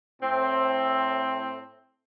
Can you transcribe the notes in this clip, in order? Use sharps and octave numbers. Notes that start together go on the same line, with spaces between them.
A2 C4